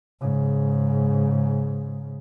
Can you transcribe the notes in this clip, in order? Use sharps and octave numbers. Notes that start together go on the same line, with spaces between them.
G#2 C#3